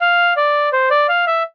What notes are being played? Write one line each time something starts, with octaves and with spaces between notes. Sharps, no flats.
F5
D5
C5
D5
F5
E5